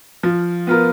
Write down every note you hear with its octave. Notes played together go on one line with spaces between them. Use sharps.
F3
B3 F4 A#4